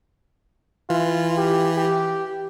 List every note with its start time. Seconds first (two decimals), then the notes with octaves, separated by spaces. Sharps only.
0.90 E3 F4
1.38 G4
1.77 G4